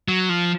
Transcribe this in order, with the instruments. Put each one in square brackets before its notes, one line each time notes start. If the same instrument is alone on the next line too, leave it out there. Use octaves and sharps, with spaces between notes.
[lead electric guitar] F#3
F3